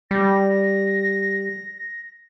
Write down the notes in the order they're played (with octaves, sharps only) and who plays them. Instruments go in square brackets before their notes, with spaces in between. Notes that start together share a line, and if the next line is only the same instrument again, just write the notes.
[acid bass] G3 [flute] A#6